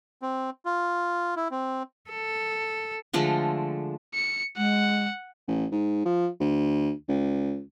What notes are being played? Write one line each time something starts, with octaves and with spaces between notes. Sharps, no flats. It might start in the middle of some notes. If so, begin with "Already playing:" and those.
C4
F4
E4
C4
A4
D3 F3 G#3 A3
C#7
G#3 F#5
A1
G#2
F3
D2
C#2